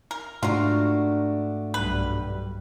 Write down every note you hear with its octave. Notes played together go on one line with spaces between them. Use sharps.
A#4
G#2 A3 D4 F4 F#4 A#4
B1 G2 G3 B4